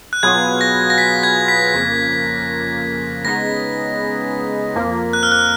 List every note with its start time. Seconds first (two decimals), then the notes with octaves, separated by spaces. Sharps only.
0.13 F#6
0.23 B2 F#3 B3 F4 G#4 G#6
0.61 A#6
0.90 A#6
0.98 B6
1.23 G#6
1.48 B6
1.74 F2 C#3 F3 A#3
3.25 C#3 G#3 B3 D#4 A#6
4.75 F2 F3 A#3
5.13 F#6
5.23 F6
5.32 F#6